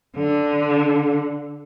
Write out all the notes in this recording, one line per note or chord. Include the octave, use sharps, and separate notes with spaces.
D3